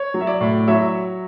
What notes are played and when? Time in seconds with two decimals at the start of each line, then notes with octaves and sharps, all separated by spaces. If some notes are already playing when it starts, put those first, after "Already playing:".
Already playing: C#5
0.14 F#3
0.21 E5
0.27 D5
0.41 A2
0.67 F#3 C#5 E5